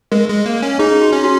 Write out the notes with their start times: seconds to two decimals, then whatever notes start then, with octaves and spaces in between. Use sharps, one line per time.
0.12 G#3 A#4
0.29 G#3
0.46 A#3
0.62 C#4
0.79 D#4 G#4
1.02 F#4
1.13 C#4
1.24 F#4